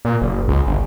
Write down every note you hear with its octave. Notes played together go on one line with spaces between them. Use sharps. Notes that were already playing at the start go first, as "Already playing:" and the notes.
A#2
F#1
C#2
G1